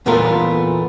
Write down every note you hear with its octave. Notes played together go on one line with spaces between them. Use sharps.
E2 A#2 A3 B3 F4 A#4